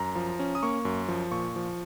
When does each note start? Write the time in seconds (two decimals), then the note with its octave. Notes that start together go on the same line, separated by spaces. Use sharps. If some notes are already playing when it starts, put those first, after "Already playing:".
Already playing: F#2 A#5
0.15 F3
0.39 C#4
0.55 D#6
0.63 A#3 C#6
0.85 F#2
1.08 F3
1.32 A#2 C#6
1.56 F3